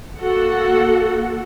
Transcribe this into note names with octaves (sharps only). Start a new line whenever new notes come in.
A#3 F#4 A4 F#5